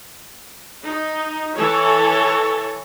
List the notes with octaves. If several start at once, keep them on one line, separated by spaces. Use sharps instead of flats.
D#4
E3 A4 C#5